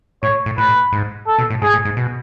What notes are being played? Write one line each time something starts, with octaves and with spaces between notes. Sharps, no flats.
A2 C#5
A2
A2 B4
G#2
A4
B2
A2
G#2 G#4
A2
G#2
B2